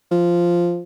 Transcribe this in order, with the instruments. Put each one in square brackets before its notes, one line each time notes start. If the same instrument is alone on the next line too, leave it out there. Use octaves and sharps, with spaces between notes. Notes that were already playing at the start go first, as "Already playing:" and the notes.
[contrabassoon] F3